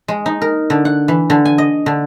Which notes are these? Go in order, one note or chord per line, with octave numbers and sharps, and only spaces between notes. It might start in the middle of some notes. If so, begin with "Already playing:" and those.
G#3
D#4
A#4
D3
F#5
E3
D3
G#5
D#5
D3